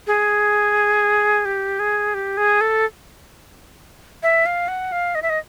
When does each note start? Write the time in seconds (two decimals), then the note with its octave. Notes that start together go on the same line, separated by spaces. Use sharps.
0.07 G#4
1.45 G4
1.79 G#4
2.14 G4
2.37 G#4
2.61 A4
4.23 E5
4.46 F5
4.68 F#5
4.92 F5
5.15 D#5
5.22 E5
5.30 D#5